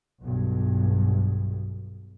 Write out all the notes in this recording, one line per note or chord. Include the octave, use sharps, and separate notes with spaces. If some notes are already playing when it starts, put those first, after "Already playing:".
B1 G2